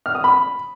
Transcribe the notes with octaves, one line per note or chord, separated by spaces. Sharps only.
F6
D#6
B5